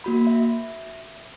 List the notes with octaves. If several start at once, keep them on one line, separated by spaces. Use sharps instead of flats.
A#3 F#4 B5
E5